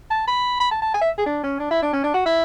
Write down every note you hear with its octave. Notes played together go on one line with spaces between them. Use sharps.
A5
B5
B5
A5
A5
G#5
E5
G#4
D4
C#4
D4
E4
D4
C#4
D4
F#4
E4